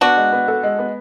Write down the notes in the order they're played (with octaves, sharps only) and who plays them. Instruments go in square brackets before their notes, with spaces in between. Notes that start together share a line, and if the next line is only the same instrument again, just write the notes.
[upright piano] B3 [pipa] D4 F#4
[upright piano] G#3
B3
A4
G#3
B3